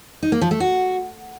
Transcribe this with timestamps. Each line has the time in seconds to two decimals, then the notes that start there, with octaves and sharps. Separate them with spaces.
0.23 D#4
0.32 A#3
0.41 F3
0.51 A3
0.60 F#4